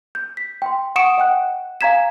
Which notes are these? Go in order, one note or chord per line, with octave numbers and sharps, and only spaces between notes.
G6
B6
G5 C6
F#5 C#6 D#6 C#7 D7 E7
D#5 F#5 G5 F#6
F5 G#5 A#5 G#6 B6 E7